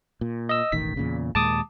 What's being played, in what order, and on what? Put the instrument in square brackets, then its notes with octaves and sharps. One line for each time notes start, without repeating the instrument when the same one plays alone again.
[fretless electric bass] A#2
[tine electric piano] D#5 E6
[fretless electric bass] E1 A1 D#3 [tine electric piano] B6
[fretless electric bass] E2 A#2 C#3
[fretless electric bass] D#2 A#2 G#3 [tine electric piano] A5 D6 D#6